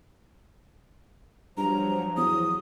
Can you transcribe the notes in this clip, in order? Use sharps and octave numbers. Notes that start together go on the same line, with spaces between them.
G2 F3 F#3 A#5
E2 D#6